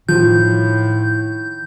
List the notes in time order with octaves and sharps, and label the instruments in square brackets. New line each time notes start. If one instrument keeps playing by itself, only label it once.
[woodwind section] A2 [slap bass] D#3 [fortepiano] F3 [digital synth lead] G6